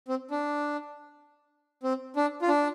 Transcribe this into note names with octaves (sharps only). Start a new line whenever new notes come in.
C4
D4
C4
D4
F4
D4